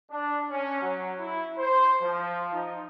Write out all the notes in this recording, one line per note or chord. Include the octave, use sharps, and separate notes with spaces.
D4
C#4
F#3
E4
C5
F3
D#4